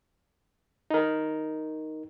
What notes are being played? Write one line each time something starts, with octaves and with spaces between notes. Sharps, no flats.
D#4 A#4